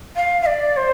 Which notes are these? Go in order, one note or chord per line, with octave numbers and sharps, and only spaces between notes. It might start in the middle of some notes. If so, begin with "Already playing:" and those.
F5
F5
D5
C5